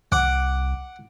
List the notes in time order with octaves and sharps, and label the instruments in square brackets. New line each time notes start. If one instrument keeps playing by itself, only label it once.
[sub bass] C2 [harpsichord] F#5 D6